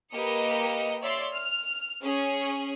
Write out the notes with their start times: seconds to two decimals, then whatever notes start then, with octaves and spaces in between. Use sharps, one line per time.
0.14 A#3 G4 A#4 B4 D#5 C#7
1.01 C#5 D5 E5 C6
1.34 F6
2.02 C#4 G#4